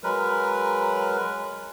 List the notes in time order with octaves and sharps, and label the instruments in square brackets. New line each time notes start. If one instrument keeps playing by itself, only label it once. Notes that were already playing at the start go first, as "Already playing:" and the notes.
[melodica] F#3 G#3 A#4 B4